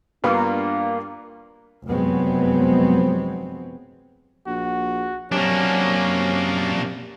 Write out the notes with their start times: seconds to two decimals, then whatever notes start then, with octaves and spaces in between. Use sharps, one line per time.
0.24 G2 A#3 B3 D4 F4
1.86 F1 F#2 F#3 G#3 B3 C4
4.47 A#1 F#4
5.32 F#2 C3 A#3 C#4 D4